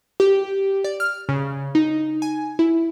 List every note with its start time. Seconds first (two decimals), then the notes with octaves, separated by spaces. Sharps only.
0.20 G4
0.84 D5
1.00 F6
1.29 C#3
1.75 D#4
2.22 G#5
2.59 E4